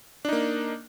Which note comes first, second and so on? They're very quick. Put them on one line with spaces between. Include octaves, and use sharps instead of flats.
D4 D#4 A#3